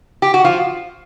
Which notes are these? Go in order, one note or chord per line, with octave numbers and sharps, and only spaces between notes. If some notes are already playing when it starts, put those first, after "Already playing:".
G4
F#4
F3 F4